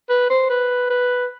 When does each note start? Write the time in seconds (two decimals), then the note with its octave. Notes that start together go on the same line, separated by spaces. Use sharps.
0.09 B4
0.30 C5
0.50 B4
0.90 B4